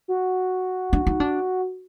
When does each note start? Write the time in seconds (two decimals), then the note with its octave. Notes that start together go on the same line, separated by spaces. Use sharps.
0.08 F#4
0.93 D4
1.07 D#4
1.20 D4